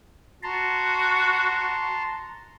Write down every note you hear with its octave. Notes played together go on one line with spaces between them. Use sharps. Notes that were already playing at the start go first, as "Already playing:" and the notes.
F#4 A5 A#5 C6